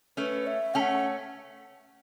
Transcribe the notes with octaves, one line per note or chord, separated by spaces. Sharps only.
A3 C#4 B4
E5
A3 C#4 F#5 A5